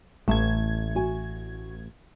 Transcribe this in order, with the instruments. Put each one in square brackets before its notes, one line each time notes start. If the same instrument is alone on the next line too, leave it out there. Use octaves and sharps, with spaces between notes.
[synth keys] A1 G#6 [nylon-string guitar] A3 A5
[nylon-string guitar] F#4 G#5